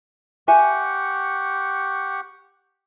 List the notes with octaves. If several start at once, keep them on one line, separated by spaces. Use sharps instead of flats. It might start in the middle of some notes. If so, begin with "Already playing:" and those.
G4 E5 F#5 G#5 C#6